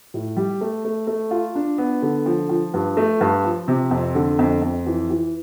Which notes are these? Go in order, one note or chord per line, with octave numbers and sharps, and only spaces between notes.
A2
G3
A3
A3
A3
F4
D4
B3
D3
F3
F3
G2
A3
G2
F3
C3
F2
D3
F2
F2
E3
E3